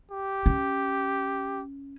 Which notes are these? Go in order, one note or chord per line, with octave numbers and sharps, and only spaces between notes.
G4
C#4